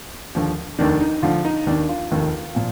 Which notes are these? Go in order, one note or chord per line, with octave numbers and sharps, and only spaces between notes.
D#2 D3 F3
F1 D#2 D#3 D4
D#4
D2 D3 F3 F4
D#4
D#2 D#3 D4
F4
F1 D#2 D#3
A#2 F3